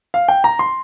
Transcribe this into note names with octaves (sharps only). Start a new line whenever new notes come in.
F5
G5
A#5
C6